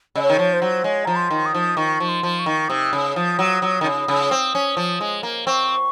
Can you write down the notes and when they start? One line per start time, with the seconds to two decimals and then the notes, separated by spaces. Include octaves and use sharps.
0.16 C#3 D#5
0.22 C#5
0.29 D#3
0.39 F3
0.53 C5
0.62 F#3
0.84 G#3 C#5
1.05 F3 A#5
1.16 C6
1.31 D#3
1.46 D#6
1.55 F3
1.77 D#3 C#6
2.00 F3
2.08 C6
2.23 F3
2.39 C#6
2.46 D#3
2.69 C3 D#6
2.93 C#3
3.15 F3 D#6
3.39 F#3
3.62 F#3
3.81 D#3
3.84 C#3
4.08 C#3
4.31 C4
4.55 C#4
4.77 F3
5.01 G#3
5.23 A#3
5.47 C4 C#6